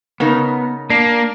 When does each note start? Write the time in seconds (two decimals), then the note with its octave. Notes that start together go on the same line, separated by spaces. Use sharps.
0.20 C#3 B3 D#4 A#4
0.90 A#3 D4 D5 C7